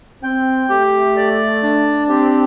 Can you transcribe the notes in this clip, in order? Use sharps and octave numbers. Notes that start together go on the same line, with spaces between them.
C4 G5
A3 G4
D5
D4
C4 G4